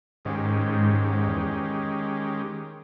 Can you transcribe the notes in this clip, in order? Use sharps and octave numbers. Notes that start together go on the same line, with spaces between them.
G#2 D#3 G#3 C#4 G4
G#2
E2